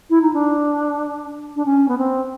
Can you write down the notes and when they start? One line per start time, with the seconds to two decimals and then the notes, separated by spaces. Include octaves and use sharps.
0.10 E4
0.21 D#4
0.33 D4
1.56 D4
1.65 C#4
1.88 B3
1.98 C4